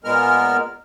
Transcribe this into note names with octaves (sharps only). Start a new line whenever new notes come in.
A#2 G#3 B3 A#4 F6